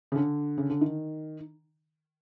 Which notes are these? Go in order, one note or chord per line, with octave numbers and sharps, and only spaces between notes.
C#3
D3
C#3
D3
D#3